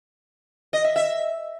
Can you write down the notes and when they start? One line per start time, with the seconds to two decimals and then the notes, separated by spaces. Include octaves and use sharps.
0.73 D#5
0.84 E5
0.96 E5